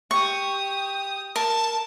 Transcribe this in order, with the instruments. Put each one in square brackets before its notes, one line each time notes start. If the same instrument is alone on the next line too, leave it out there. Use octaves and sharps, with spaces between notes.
[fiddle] G4 D#6 [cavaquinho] C#6
[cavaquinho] A#4 [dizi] A5